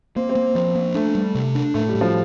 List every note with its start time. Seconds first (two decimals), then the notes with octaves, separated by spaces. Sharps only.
0.16 A#3 C4
0.29 C4
0.35 A#3
0.55 F3 C4
0.75 A#3
0.95 A3 D4
1.15 G3
1.35 C3
1.55 D4
1.74 A2 A3
1.89 G3
1.95 A2
2.01 F3